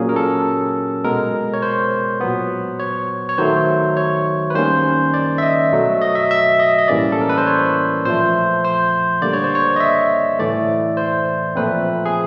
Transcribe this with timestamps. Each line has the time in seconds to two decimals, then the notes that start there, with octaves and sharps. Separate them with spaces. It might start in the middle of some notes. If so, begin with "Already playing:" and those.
Already playing: A#2 F#3 A#3 C#4 G#4
0.09 A#4
0.16 A4
1.04 B2 G#3 B3 A#4
1.53 C#5
1.62 C5
2.21 A#2 F#3 B3
2.80 C#5
3.29 C#5
3.38 D#3 F#3 A3 C5
3.97 C#5
4.50 B4
4.54 D#3 G3 A#3 C#4 C5
5.14 D5
5.38 E5
5.42 D#5
5.72 B2 F#3 A3
6.01 D#5
6.15 E5
6.31 E5
6.60 D#5
6.78 D#5
6.88 A2 E3 G3 A#3 C#4 D5
7.12 A4
7.21 A#4
7.29 B4
7.38 C5
7.47 C#5
8.05 A#2 F3 A3 C5
8.64 C5
9.22 D3 G3 A#3 D5
9.33 C#5
9.44 C5
9.55 C#5
9.76 D#5
9.80 E5
10.39 A2 E3 A3 D5
10.97 C5
11.56 A#2 F3 A3 C4 B4
12.05 G#4